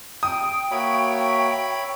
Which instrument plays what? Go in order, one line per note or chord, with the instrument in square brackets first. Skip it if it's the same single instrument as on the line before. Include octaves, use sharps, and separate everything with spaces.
[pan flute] G5 [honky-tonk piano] D#6
[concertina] A#3 F#4 [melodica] C#5 E5 B5